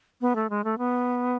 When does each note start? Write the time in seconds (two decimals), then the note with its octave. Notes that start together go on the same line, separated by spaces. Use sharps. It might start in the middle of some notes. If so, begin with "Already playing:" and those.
0.21 B3
0.35 A3
0.50 G#3
0.64 A3
0.78 B3